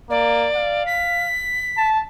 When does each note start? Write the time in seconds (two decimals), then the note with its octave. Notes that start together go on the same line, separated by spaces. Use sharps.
0.10 A#3 D5
0.56 F5
0.87 B6
1.77 A5